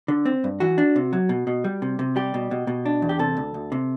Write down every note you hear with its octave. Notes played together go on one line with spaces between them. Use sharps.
D3
C4
G2
E3 F#4
D4
C3
F#3
B2
B2
G3
C3
C3
G3 G4
B2
B2
B2
D4
E2
G4
C3 A4
D2
D2
C3